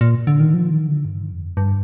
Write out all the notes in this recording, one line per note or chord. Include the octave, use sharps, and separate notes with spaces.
A#2
D3
D#3
F3
D#3
D3
G2
F2
G2